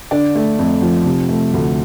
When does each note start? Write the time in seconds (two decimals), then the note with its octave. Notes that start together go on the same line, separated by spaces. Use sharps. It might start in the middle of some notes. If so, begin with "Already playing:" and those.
0.11 D3 D4 D5
0.36 A3
0.59 F2
0.82 F3
1.05 C3
1.29 A3
1.53 D2